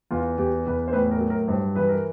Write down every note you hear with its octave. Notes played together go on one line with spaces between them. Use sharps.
E2 F4
E2 G4
E2 B4
C5
A2 B4
A#4
F#3
A#4
G2 C5
E3 B4
A#4